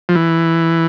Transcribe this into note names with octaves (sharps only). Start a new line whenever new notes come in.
F3
E3